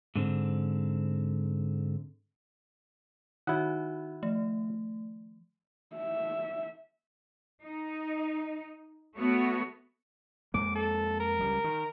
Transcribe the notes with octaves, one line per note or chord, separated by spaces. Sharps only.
G#2 D3 C4
D#3 D#4 E4 F#4 F#5
F3 A3
E5
D#4
A3 B3 F#4 C#5
F2 G#3 A#3 D6
A4
A#4
C#2 G3
D#3